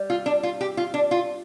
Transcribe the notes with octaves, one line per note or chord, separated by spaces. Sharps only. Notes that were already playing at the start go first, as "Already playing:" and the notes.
Already playing: G3
F4
D4
F4
G4
F4
D4
F4